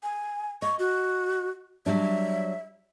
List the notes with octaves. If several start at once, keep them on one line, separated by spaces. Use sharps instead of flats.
G#5
D#5 C#6
F#4
F#3 G3 D4 E5